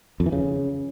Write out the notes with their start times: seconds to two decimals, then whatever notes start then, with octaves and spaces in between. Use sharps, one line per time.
0.20 F2
0.26 E3
0.32 C#3